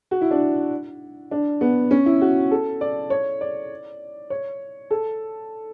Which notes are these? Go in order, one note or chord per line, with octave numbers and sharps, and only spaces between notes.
F#4
E4
D4
D4
B3
C#4
E4
F#4
A4
D5
C#5
D5
C#5
A4